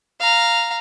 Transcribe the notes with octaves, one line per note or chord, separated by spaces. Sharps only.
F5 A#5